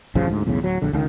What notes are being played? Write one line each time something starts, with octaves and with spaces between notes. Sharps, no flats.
A1 F#2 C#3 F3
D2 G#2
B1 E2 A2 C#3
D1 F#3
A#1 D3
C#2 D#3